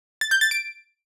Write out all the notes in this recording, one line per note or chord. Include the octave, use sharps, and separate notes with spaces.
A6
G6
A6
D7